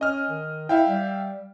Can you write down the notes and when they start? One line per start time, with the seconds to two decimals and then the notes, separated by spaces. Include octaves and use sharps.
0.01 C#4 D#5 F6
0.30 D#3
0.69 E4 E5 F5 G5
0.87 G3